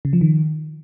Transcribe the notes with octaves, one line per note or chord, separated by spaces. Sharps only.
C#3
F3
D#3